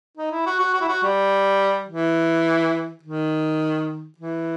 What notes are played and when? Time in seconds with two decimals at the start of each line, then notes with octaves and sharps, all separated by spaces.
0.17 D#4
0.31 E4
0.46 F#4
0.59 F#4
0.74 F#4
0.81 E4
0.88 F#4
1.03 G3
1.88 E3
3.03 D#3
4.18 E3